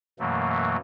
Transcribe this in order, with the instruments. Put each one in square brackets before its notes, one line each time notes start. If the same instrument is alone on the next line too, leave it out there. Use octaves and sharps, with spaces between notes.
[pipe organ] F#2 B2 E3 F#3 A3 A#3